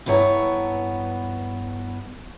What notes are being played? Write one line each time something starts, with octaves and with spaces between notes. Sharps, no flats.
G2 B3 E4 C#5 A#5